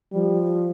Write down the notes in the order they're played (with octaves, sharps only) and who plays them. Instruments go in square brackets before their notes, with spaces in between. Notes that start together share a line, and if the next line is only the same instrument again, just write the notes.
[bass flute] F3 [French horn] G3